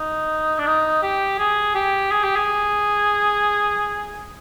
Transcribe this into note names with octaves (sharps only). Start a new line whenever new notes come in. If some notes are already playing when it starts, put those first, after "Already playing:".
Already playing: D#4
D4
D#4
G4
G#4
G4
G#4
G4
G#4